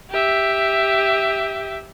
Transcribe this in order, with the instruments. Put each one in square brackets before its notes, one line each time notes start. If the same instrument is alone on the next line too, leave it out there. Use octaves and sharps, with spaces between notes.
[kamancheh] G4 E5